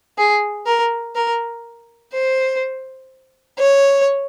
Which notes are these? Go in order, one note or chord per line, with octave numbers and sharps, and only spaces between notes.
G#4
A#4
A#4
C5
C#5